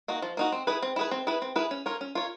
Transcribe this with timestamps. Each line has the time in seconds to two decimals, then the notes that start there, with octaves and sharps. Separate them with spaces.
0.08 A#3 D#4 F#4
0.22 F3
0.37 A#3 D#4 F#4
0.52 C4
0.67 E4 G#4 B4
0.82 C4
0.96 E4 G#4 B4
1.11 C4
1.27 E4 G#4 B4
1.42 C4
1.56 E4 G#4 B4
1.71 C#4
1.86 F4 A#4 C#5
2.01 C#4
2.15 F4 A#4 C#5